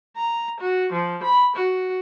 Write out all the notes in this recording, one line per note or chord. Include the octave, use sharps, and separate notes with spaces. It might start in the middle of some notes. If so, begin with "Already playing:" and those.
A#5
F#4
F3
B5
F#4